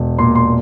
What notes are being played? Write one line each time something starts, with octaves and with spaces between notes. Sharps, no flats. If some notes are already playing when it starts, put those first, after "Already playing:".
Already playing: E1
A#2 C6
C6